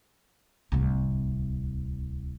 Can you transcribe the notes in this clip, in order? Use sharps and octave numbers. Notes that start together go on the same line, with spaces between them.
D1 C2